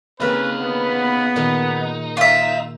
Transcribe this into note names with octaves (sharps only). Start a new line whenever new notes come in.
C#3 A#3 C4 C#4 D#4 B4 F5
B3
A#2 D#3 D#4 C6
F4 E5